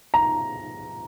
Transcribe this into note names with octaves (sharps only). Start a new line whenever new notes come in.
A#5